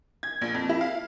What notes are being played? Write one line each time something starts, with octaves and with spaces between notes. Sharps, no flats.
G#6
A#1
F2
E4
F5